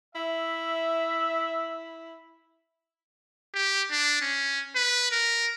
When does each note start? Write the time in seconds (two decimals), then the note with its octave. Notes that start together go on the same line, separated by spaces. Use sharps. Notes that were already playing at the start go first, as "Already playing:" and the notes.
0.15 E4 E5
3.54 G4
3.91 D4
4.21 C#4
4.76 B4
5.11 A#4